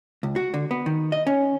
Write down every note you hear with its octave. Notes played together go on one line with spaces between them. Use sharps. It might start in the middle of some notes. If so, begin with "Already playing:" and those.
C#2
F#4
D3
B3
D#3
D#5
C#4